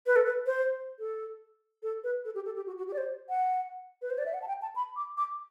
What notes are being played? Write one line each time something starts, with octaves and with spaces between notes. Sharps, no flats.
B4
A4
B4
C5
A4
A4
B4
A4
G4
A4
G4
F#4
F#4
G4
D5
C5
F#5
B4
C5
D5
E5
F#5
A5
G5
A5
B5
D6
D6